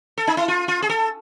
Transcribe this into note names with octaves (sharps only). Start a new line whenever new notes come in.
A4
D#4
E4
F4
F4
G#4
A4